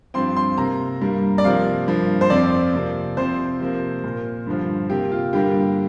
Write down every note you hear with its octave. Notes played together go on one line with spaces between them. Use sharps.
G2 F3 C4 C6
C6
C3 A#3 A#5
G2 G3 A#3
D5
C3 F3 A#3 F5
G2 F3 A#3
C5
F2 F3 C4 D5
C3 F3 A#3
C3 F3 C4 C5
C3 F3 A#3
A#2 A#3
G2 D3 F3
C3 A#3 G4
F4
G2 D3 G3 A#3 G4